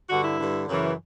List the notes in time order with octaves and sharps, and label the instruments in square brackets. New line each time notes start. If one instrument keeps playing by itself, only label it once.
[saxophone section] G2 D3 F#4
E4
G2 D3
F#2 C#3 E3